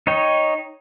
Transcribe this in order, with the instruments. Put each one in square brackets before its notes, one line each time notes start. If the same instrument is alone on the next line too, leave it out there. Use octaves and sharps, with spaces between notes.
[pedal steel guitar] D#4 C#5 G5